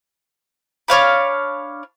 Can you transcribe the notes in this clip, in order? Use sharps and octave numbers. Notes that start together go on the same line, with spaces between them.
D4 C#5 F5 B5